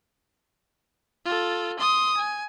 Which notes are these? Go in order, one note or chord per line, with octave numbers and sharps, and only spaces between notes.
F4 A4
C6 D#6
G#5